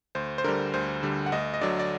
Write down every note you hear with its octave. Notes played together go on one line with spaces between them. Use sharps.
D2 C5
C5
D3 G3 A#4
D2 C5
D3 G3
F#5
D2 D#5
D#5
D3 F#3 D5
D5